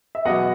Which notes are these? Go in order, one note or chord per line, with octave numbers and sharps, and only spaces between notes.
E5
E2 B2 F#3 D#5 F#5